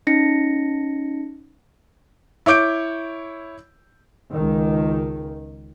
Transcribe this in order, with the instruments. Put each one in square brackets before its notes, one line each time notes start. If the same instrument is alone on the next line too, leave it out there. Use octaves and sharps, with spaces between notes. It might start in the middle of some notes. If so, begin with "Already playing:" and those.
[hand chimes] C#4 D#4 A#6 C#7
[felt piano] E4 C#5 D6 G6 D7
[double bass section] C#2 D#3